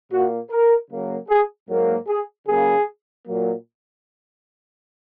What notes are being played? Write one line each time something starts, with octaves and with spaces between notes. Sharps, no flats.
A#2 A#3 F#4
A#4
C#3 F#3 A#3
G#4
G#2 F#3 A#3
G#4
C#3 F#3 A#3 G#4
A#2 F#3 A#3